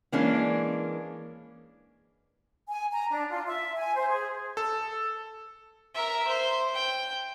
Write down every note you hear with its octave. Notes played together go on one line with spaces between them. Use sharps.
E3 G#3 A#3 C#4 D4
G#5
A#5
D4
F4
E5
G#5
C5
G#4
A4
A#4 E5
C5
G5